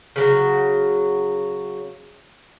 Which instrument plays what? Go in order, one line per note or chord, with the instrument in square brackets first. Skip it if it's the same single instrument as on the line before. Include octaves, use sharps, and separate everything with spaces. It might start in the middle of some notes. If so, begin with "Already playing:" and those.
[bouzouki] C#3 E3 F#3